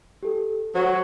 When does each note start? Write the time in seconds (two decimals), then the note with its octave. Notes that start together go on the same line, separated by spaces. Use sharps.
0.23 G4 A4
0.75 F#3 C5 C#6